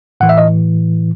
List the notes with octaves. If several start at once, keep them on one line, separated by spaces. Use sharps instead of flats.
A2 E3 F#5
E5
D#5